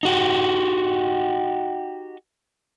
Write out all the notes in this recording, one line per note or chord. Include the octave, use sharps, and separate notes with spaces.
D#4 F#4 G4